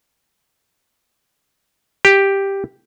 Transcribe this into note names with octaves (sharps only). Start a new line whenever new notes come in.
G4